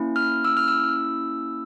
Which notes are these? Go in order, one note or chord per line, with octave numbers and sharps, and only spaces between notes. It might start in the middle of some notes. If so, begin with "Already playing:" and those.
Already playing: A#3 C#4 E4
F6
E6
F6
E6